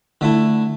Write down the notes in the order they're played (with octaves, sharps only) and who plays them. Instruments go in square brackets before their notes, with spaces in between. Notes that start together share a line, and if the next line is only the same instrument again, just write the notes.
[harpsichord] D3 A3 E4